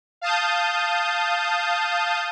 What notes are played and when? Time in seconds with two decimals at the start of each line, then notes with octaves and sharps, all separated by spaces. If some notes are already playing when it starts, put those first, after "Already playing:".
0.21 F5 A5 D#6 G6